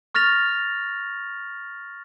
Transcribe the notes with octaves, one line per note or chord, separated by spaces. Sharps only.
C#6 F6 A6 A#6 F7